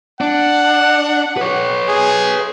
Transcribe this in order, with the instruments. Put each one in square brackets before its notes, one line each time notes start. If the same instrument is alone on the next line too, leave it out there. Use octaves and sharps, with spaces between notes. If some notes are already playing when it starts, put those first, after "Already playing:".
[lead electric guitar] D4 [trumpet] F#5
[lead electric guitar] B4 C#5
[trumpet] G#4